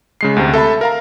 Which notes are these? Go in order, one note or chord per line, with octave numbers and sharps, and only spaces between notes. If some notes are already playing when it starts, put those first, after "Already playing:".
C#3 G#3 C7
D2 C3
A4 E5 A5 B5
A#4 F5 A#5